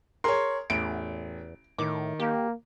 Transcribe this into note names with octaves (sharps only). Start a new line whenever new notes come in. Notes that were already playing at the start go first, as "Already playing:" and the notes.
G#4 A#4 C#5 C6
A1 E2 D7
A2 D#3 D6
A#3 G4